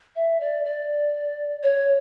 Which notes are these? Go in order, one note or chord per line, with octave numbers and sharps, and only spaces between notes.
E5
D5
D5
C#5